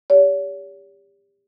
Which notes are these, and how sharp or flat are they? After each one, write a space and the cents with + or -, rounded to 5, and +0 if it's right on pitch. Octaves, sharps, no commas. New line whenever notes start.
G4 +30 C#5 +45